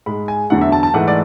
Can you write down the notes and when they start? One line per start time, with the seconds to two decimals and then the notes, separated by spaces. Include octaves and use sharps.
0.06 G#2 G#3 B5
0.28 G#5
0.50 E2 D3 F#3 F#5
0.61 E5
0.72 A5
0.83 A5
0.94 G#2 E3 A3 F#5
1.08 D5